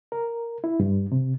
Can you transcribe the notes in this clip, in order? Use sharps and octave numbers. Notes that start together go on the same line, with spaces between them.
A#4
E4
G2
C3